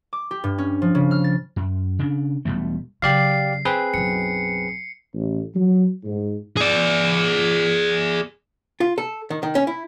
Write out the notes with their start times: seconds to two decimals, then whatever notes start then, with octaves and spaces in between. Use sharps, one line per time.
0.13 D6
0.31 G4
0.44 G2
0.58 C#4
0.82 F3
0.95 C#3
1.11 F6
1.24 A6
1.56 F#2
1.99 C#3 D4
2.45 E1 B2 G3 A3
3.02 C#3 F#3 G4 D5 F5 C7
3.65 C4 G#4 B4
3.94 B1 F#2 C#7
5.13 A1
5.54 F#3
6.04 G#2
6.57 G#4 D5
8.80 F4
8.98 A4
9.30 D#3
9.43 D#3
9.55 C#4
9.67 E4